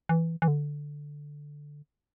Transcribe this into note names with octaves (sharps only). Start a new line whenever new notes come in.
E3
E3
D3